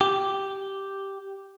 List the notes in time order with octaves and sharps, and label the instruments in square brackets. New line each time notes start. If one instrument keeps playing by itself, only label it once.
[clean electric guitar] G4